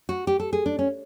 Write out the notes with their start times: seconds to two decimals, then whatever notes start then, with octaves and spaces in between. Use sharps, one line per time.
0.09 F#4
0.27 G4
0.40 A4
0.53 G#4
0.66 D4
0.79 C#4